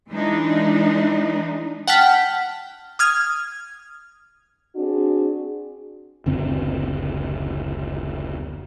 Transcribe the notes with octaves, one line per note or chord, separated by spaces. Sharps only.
E3 G#3 D4 D#4
F#5 G5 A5 F6 B6
D#6 F6 G#6
C4 D4 F#4 G#4
F#1 D2 C4